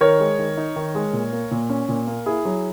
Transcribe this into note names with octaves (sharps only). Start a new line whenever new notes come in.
D#3 A#4 C#5
G#3
D#3
D#4
D#3
G#3
A#2
A#3
A#2
C#4
A#2
A#3
E4 G#4
F#3